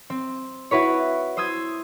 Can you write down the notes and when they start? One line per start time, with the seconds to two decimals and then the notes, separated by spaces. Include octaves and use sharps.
0.10 C4
0.71 E4 F#4 B4 C#5
1.37 C5 D#6 E6 G6 G#6